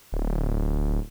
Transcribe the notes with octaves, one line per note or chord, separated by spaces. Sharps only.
D1